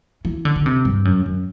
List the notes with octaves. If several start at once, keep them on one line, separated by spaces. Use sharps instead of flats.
E3
D3
D3
C3
G2
F#2
F#2